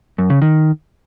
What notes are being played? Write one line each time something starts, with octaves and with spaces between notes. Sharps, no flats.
F#2
C#3
D#3